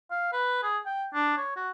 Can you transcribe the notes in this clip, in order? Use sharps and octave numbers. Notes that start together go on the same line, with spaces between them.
F5
B4
G#4
G5
D4
C#5
F#4